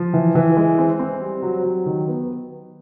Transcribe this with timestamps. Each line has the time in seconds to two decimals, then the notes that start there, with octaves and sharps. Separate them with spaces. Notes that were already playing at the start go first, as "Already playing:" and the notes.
Already playing: F3
0.13 E3
0.35 E3
0.57 G#3
0.78 C4
0.99 C4
1.21 G3
1.42 F#3
1.64 F#3
1.86 D#3
2.07 B3